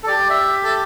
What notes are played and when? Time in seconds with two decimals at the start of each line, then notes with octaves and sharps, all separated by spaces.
0.03 A4
0.07 G4 D5
0.30 E5
0.64 A4